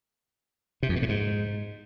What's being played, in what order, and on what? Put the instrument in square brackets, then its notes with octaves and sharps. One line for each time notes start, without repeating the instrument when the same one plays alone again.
[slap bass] C3
F2
B2
A2
G#2